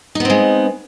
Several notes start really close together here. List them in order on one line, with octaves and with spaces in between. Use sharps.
D#4 B3 C4 G#3